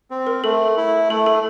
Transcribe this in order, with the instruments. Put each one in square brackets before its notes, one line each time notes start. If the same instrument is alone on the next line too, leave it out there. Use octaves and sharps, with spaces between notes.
[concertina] C4
[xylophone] A#4
[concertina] A3 [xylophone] A4
[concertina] E4
[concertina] A3 [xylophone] A4
[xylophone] A4